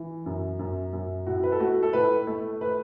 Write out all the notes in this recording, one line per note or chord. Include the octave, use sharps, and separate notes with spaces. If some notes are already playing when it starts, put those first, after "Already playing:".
Already playing: E3
F#2
F#2
F#2
A2 F#4
B4
A4
A3 F#4
A4
A2 B4
A3
B4